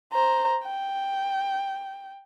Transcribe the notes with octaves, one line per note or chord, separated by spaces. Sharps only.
C5 A#5
G5